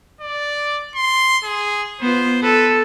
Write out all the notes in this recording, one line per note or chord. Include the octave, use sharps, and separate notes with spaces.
D5
C6
G#4
B3 F4 C5
A4 B4